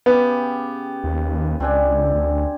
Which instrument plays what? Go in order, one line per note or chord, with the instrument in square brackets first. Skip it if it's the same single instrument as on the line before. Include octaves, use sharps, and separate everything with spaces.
[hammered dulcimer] C#3 G4 [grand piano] B3
[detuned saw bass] D#2
[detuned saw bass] C#2 [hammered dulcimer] C4 D4 G#5
[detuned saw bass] D2